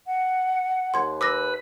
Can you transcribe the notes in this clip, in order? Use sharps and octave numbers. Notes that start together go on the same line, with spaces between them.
F#5
D#2 C6 G#6
B4 D6 E6 A#6